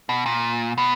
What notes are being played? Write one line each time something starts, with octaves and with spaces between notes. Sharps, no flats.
B2
A#2
B2